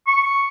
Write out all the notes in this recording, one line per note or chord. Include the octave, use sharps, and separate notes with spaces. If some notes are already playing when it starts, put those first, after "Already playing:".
C#6